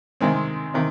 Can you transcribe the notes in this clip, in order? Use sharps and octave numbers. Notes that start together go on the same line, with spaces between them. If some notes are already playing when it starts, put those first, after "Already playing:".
C3 D#3 G#3 C4
C3 D#3